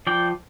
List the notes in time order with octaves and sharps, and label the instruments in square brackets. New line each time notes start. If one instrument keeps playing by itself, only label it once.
[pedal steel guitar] F3 D5 G5